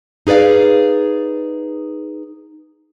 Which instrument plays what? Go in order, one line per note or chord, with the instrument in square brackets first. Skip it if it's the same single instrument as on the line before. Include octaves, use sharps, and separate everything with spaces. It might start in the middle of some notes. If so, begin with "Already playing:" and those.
[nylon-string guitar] D#4 G#4 B4 D5 F5